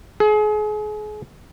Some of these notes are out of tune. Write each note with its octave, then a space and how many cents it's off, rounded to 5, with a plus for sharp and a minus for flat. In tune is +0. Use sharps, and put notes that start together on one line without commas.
G#4 +35